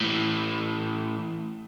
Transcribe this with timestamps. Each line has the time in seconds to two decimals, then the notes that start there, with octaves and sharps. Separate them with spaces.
0.01 A2 E3